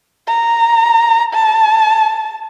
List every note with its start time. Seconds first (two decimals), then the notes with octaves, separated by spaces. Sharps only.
0.28 A#5
1.33 A5